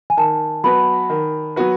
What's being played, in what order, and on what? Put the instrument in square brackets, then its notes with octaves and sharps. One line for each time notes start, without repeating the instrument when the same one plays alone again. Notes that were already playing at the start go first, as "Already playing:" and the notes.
[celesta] G#5
[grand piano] D#3 [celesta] A5
[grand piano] F#3 B3 F#4 B4 [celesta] B5
[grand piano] D#3
F#3 B3 F#4 B4